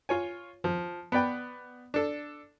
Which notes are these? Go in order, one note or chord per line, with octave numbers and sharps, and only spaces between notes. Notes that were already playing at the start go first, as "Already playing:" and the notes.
F4 C#5 G#5
F3
B3 B4 D5 G5 B5
D4 A4